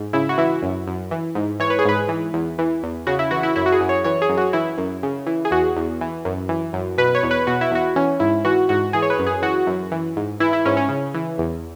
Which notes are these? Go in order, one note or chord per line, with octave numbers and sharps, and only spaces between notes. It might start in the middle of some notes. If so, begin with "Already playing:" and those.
Already playing: G#2
C#3 E4
F#4
E3 E4
F#2
F#2
E3
G#2
E3 C#5
B4
G#4
G#2 B4
E3
E2
E3
E2
C#3 F#4
E4
E3 F#4
E4
F#2 E4
F#4
G#4
F#2
C#5
E3 C#5
G#4
F#2
F#4
E3 E4
F#2
C#3
E3
G#4
E2 F#4
E2
E3
F#2
E3
F#2
B2 B4
C#5
E2
B4
B2 F#4
E4
E2 F#4
E3 C#4
G#2 E4
E3 F#4
G#2 F#4
E3 G#4
C#5
B4
F#2
G#4
E3 F#4
F#2
E3
G#2
E3 E4
E4
G#2 C#4
C#4
C#3
E3
E2